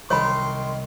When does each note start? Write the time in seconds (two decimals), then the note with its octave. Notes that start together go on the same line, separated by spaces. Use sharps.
0.10 C2 D#3 G3 C#5 B5 C6